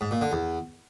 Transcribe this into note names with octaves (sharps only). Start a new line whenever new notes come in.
G#2
A#2
D3
E2